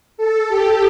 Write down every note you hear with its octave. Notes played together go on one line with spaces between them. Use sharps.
A4
G4